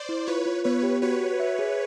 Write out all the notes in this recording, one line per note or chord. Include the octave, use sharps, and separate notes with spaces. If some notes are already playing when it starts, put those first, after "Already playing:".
Already playing: C5 D5
E4
F4 B4 C#5
F4
B3 B4 C#5
G4
F#4 B4 C#5
F#4
E5
G#4